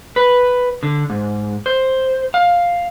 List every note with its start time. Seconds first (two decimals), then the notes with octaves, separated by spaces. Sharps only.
0.16 B4
0.83 D3
1.10 G#2
1.66 C5
2.34 F5